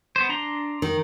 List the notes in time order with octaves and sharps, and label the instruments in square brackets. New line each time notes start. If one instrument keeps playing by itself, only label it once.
[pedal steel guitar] B3 C5
D4 A#5 C6
[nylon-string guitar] D#3